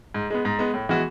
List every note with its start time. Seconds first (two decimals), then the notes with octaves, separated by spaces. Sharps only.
0.14 G#2
0.30 G#3 B3
0.45 G#2
0.59 G#3 B3
0.74 A2
0.89 E3 G#3 B3 F#4